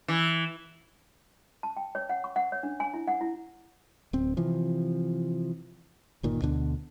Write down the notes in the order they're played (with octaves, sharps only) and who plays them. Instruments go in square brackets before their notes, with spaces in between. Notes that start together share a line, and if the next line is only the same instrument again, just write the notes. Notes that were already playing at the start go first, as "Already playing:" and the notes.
[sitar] E3
[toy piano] A5
G5
C#5
F#5
C#6
F#5
C#5
D4
G#5
E4
F#5
E4
[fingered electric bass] D1 C4
C3 E3 F3
G1 A#2 D#3
D2 B2 D3 D4